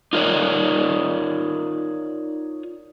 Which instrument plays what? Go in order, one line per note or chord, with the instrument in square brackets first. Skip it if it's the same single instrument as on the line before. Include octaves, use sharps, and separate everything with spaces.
[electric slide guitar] D#4 F4 A#4 C#5 D5